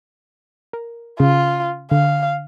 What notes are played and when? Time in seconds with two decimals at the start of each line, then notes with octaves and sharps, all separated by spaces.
0.73 A#4
1.20 C#3 F4
1.91 D3 F5